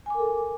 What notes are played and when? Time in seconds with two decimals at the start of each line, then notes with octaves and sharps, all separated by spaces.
0.06 G#5
0.10 D6
0.15 A#4
0.19 A4